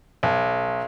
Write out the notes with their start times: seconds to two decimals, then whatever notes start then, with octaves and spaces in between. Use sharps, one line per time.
0.23 B1